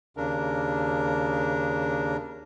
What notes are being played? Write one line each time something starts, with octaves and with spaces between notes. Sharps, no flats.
D#2 C#3 D4 A#4